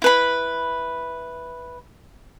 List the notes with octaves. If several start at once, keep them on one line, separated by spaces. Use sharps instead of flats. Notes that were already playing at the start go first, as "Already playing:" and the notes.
E4 B4 B5